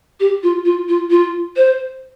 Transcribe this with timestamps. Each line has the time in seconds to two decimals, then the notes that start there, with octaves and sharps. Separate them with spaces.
0.20 G4
0.43 F4
0.65 F4
0.88 F4
1.10 F4
1.56 C5